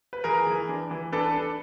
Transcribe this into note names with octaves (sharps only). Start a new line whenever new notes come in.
B4
E3 G#4 A#4
E3
D4
E3
D4 A4 B4
D4